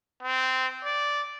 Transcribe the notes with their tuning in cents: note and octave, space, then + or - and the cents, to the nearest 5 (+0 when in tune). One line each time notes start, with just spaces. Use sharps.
C4 -15
D5 -10